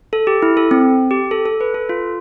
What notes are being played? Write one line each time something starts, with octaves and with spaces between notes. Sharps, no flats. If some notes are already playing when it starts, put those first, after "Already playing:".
A4
G4
E4
A4
C4
G4
A4
A4
B4
A4
F4